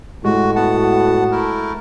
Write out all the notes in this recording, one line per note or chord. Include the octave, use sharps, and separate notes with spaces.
A2 G#3 F#4
B3 F#4 F#5 A5
A3 E4 A#4